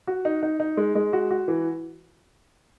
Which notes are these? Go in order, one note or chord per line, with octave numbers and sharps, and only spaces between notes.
F#4
D#4
D#4
D#4
G#3
G#3
F#4
F#4
E3